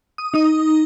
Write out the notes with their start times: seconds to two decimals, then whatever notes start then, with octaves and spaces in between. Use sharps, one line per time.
0.18 D#6
0.34 D#4 D#6